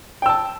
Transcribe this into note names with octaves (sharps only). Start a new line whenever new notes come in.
G5 A5 E6